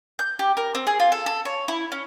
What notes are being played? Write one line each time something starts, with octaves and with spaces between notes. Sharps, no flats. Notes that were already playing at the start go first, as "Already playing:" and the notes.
G6
G4
A#4
C4
G#4
F4
A4
A4
C#5
E4
C#4